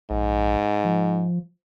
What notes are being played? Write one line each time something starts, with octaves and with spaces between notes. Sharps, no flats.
A#1 G#2
F3